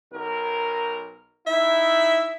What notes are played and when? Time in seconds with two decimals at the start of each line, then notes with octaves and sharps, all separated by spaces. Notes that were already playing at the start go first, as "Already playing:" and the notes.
0.13 B1 A#4
1.47 D#4 E4 E5